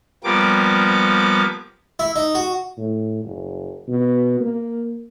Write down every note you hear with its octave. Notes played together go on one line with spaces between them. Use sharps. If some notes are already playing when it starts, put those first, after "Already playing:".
F3 G3 A#3 B3 D6
E4
D#4
F#4
A2
F#1
B2
A#3